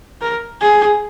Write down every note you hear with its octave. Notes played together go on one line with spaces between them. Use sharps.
A#4
G#4